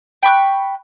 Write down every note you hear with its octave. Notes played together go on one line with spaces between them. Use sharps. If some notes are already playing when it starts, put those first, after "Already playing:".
G5 B5 C#6 F#6